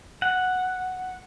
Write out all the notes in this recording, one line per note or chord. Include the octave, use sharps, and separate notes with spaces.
F#5